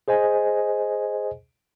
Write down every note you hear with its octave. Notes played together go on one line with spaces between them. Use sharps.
G#4 C5 D#5 G#5